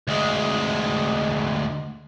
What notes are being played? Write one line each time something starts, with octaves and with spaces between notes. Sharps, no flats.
D2 G#3